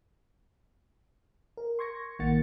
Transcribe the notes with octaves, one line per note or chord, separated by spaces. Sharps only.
A#4
C6 C#6 G#6 A#6 C#7
A#1 D#3 A#3 F#5 A6 C#7